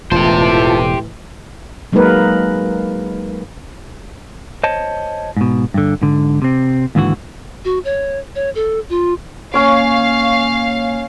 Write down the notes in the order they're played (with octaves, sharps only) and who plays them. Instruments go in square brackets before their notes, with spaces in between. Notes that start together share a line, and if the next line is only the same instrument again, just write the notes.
[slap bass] E1 [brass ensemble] A2 E3 [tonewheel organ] F4 A5 [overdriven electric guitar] G4 C5
[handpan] F#3 G#3 A#3 D#4 A#4 B4
[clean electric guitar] C5 C#5 D#5 A5
G#2 B2
G2 D3
G#2 D3
C3 C4
D#2 G#2 D3 E3 F#4
[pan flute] F#4
C#5
C#5
A4
F4
[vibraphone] A#3 G#5 C#6 [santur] C#4 C#5 [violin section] F5